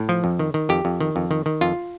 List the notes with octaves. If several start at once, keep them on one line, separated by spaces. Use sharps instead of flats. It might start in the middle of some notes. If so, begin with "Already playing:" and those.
Already playing: A2
F3
F2
D#3
D#3
F2 G4
F2
D#3
F2
D#3
D#3
F2 F4